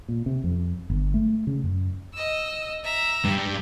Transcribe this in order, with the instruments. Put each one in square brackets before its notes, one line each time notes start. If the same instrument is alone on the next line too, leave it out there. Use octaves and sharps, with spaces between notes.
[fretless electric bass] A#2
C3
F2
G1
A3
C#3
F#2
[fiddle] D#5 E6
E5 A#5
[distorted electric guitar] G2